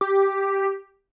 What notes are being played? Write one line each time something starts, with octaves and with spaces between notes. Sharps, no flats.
G4